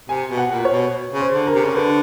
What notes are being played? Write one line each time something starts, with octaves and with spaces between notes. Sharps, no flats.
C3 G#5
B2
F#5
A#2
C#5
B2
C#3
C5
D3
A#4
C3
C#3
D3 B4